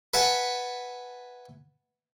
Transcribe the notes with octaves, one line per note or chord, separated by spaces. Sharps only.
B4 E5 F#5 G#5 A5